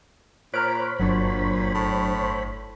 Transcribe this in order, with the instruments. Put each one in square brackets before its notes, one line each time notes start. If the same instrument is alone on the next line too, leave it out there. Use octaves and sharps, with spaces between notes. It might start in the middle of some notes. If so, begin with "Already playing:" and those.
[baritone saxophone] A#2 [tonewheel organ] C5 C#5 B5 [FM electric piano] A#5 F6 F#6 [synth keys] D7
[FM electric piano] G1 [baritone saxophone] A#2 [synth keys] F#3 D4
[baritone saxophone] A2